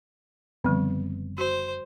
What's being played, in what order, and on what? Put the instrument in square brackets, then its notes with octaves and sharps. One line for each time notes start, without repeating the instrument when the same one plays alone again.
[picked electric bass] F#1 B3 C4 [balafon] D3 F3 G3
[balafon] F#4 [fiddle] C5